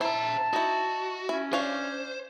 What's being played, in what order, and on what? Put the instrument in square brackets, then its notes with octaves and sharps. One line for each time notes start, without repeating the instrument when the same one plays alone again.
[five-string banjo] E4 [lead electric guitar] C5 A#5 [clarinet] A5
[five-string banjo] D#4 E4 [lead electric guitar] F#4
[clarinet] C#4 [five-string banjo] E4
[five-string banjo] D4 C#5 F5 [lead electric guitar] C5